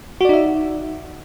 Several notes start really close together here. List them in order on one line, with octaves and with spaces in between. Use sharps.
F#4 D5 D#4 E5